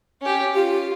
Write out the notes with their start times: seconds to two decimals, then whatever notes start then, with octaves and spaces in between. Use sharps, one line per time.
0.21 C#4 G4
0.55 F4 G4